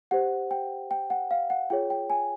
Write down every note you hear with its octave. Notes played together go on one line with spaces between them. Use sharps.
G4 C5 F#5
G5
G5
F#5
F5
F#5
F4 G#4 C#5 G5
G5
G#5